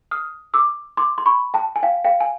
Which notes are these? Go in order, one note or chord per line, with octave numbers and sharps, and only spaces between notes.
D#6 F6
D6 E6
C6 D6
C6
B5 C#6
G5 A5
G#5
F5 G5
F5 G5
G#5